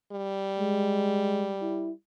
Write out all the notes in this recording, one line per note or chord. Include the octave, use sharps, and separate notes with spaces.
G3
G#3
E4